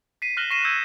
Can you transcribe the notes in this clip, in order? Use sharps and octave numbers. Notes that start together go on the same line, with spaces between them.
B6 C7 D#7
F6 F#6 A#6 E7 F#7 G7
C#6 A#6 C7 D#7 E7
D#6 E6 G6 G#6 C#7 D#7